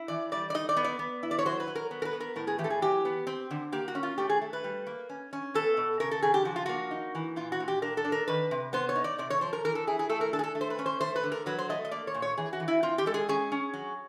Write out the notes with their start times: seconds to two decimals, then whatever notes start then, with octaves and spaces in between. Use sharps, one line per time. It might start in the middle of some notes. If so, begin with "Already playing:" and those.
Already playing: E4
0.08 E3 D5
0.32 G3 D5
0.50 D5
0.54 D#4 D#5
0.69 D5
0.76 B3
0.84 D5
0.99 B3
1.23 E4
1.31 D5
1.39 C#5
1.46 F#3 C5
1.60 B4
1.68 F#3
1.75 A#4
1.91 B3
2.02 A#4
2.05 B4
2.13 B3
2.20 A#4
2.36 A2 A#4
2.47 G#4
2.58 E3 G4
2.64 A4
2.70 G#4
2.82 F#3 G4
3.05 B3
3.27 C4
3.51 D3
3.73 A#3 G4
3.88 F#4
3.95 C#4
4.03 F4
4.18 A3 G4
4.29 G#4
4.41 A3
4.53 B4
4.64 G3
4.87 A#3
5.09 C#4
5.33 C#4
5.54 B3 A4
5.77 B2
6.00 C#3 A#4
6.11 A4
6.22 C#3 G#4
6.34 G4
6.45 F3 F#4
6.56 F4
6.66 A#3 F#4
6.91 D#4
7.15 E3
7.36 A#2 F4
7.52 F#4
7.60 A#2
7.68 G4
7.82 D4 A#4
7.97 A4
8.05 D4
8.12 A#4
8.28 D#3 B4
8.51 C3
8.73 B3 C5
8.89 C#5
8.96 D#4
9.04 D5
9.18 C3 D5
9.30 C#5
9.41 F3 C5
9.53 A#4
9.64 E3 A#4
9.75 A4
9.87 E4 G#4
9.99 G#4
10.09 A3 A4
10.21 A#4
10.33 D4 A4
10.39 G#4
10.44 A4
10.55 A3
10.61 C5
10.70 B4
10.79 C#4
10.86 C5
11.01 A3 C5
11.16 B4
11.23 D3
11.32 A#4
11.46 F#3 B4
11.58 C5
11.69 A3 D#5
11.85 D#5
11.91 A#3 D5
12.07 C#5
12.14 A#2
12.22 C#5
12.37 E3 G#4
12.53 F#4
12.60 E3
12.68 E4
12.83 C4 F4
12.98 G4
13.06 G#3 A4
13.14 G#4
13.29 C#4 G#4
13.52 C#4
13.74 F#3